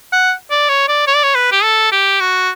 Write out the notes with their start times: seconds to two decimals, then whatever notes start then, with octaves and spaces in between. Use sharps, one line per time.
0.12 F#5
0.50 D5
0.69 C#5
0.88 D5
1.07 C#5
1.15 D5
1.23 C#5
1.35 B4
1.52 G4
1.63 A4
1.92 G4
2.20 F#4